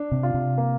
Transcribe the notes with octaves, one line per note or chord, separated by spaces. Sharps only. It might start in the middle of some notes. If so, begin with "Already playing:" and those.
Already playing: D4
C3
F4
C3
A#3